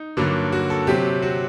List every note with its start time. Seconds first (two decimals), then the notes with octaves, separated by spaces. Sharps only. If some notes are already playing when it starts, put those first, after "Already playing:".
Already playing: D#4
0.17 G2 D3 F#3 A#3
0.52 F#4
0.70 A4
0.87 C3 F#3 C4 G4
1.22 F#4